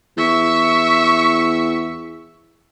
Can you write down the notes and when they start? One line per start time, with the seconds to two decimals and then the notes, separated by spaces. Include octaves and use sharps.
0.17 E2 E5 C#6